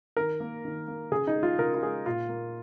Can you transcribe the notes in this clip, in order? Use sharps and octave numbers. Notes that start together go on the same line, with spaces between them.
D#3 A#4
A#3
D#3
A#3
C#3 G#4
D#4
G#3
F4
C#3 A#4
F4
G#3 G#4
A#2 F4
A#3